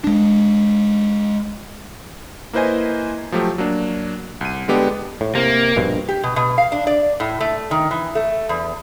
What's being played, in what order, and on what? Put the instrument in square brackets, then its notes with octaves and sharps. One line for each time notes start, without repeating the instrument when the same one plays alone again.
[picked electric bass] G#3 D4
[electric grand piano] A#3 E4 B4 C5 D#5 G#5
F3 F#3 A3 G4
F#3 A#3 D4
C2 D#7
D3 G#3 B3 G4 A4 D5
[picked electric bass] A2
[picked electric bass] C3 [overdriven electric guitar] A#3
[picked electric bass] A#1 G2 B2
[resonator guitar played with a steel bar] G4
B2
B2
F5
D4
D5
A2
A3
D#3
E3
A3
E2